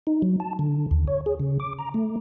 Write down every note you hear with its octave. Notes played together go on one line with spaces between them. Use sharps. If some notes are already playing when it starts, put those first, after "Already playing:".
D#4
F#3
A5
D3
D#2
C#5
G#4
C#3
D6
A#5
A3